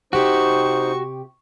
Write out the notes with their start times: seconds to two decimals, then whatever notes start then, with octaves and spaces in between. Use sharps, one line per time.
0.13 C3 D#4 F#4 G4 C5 C#6